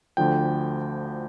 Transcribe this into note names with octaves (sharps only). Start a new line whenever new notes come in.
D2 D3 F3 G5